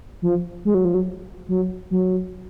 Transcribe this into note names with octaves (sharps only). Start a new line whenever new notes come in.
F3
G#3
F#3
F3
F#3
F#3
F#3